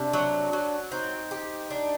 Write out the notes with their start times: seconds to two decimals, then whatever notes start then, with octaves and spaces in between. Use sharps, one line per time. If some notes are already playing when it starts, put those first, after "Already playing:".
Already playing: C3 D4
0.13 F#3
0.53 F#3
0.92 C4 D#4
1.31 G4
1.70 D4